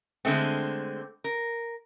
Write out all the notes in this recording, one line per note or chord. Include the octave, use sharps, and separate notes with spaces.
D3 G#3 A3 C4
A#4